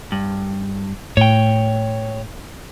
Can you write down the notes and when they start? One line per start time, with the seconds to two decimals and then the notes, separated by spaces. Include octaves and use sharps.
0.12 G2
1.17 A2 C#5 G5